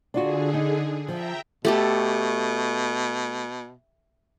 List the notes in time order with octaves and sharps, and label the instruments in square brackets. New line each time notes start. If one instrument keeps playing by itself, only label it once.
[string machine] D3 G#4 [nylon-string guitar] D4 F4 F#4
[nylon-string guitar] D#4
[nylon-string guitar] F3 [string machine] E5 G5 A#5
[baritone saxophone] B2 [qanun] A3 G4 A4